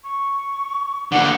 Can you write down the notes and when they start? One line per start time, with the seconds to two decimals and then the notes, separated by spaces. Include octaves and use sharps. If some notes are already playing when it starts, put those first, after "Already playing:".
0.04 C#6
1.12 D3 A#3 F#5